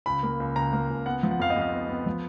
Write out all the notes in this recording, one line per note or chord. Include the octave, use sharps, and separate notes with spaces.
C#2 B5
A#3
C#2
C#2 A#5
A#3
C#2
B3 F#5
F3
F#5
F2 F5
D#5
F2 F5
B3
B3
F3